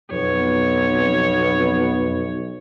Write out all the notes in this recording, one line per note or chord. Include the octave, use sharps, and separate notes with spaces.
B1 F2 B3 C#5